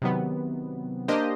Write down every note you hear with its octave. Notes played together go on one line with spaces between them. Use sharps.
C3 D#3 F#3 B3
A#3 D4 G4 C5 D#5